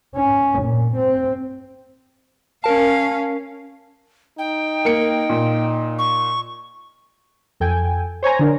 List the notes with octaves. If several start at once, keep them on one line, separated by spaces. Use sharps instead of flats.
C#4
A#2
C4
C#4 A#4 F5 A5
D#4 G5
A#3 C#7
A#2
C#6
F2 A4 G5 G#5
C5 C#5 G#5 A#5
D3 D4 A#4